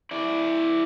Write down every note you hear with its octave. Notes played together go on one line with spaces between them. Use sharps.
E4 D5